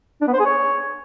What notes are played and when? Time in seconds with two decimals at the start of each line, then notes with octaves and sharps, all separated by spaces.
0.21 D4
0.27 B3
0.33 C5
0.40 G#4
0.46 C#5